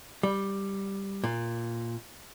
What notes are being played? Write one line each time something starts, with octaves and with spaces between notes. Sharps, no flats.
G3
A#2